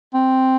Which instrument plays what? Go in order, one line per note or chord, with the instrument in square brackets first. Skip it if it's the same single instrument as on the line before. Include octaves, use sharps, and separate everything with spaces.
[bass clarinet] C4